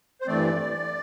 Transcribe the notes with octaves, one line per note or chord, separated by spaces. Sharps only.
C5
G2 E3 A3 C4 D5